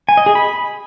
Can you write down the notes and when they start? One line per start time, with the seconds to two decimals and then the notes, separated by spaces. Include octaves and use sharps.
0.09 G#5
0.17 D#5
0.26 G#4
0.35 B5